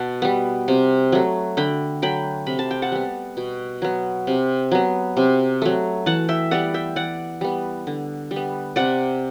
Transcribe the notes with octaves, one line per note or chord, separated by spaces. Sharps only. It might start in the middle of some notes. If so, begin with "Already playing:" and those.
Already playing: B2 F#5 A5
G3 B3
C3
F#3 A3
D3 G5 B5
F#3 A3 G5 B5
C3 B5
A5
G5
F#5 A5
G3 B3
B2
F#3 B3
C3
F#3 B3
C3
F#3 A3
E3 F#5 A5
E5 G5
G3 B3 D5 F#5
E5 G5
E3 D5 F#5
G3 B3
D3
G3
B3
C3 D5 F#5